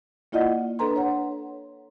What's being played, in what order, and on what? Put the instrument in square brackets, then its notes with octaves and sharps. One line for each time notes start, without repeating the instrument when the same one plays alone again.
[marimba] A#3 E4 F4 D5 D#5 F#5
D4 A4 B4 A#5 C6
C#5 F#5